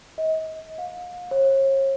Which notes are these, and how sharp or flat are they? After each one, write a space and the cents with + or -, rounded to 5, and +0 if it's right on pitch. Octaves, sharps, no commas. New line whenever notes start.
D#5 +35
F5 +40
C#5 -40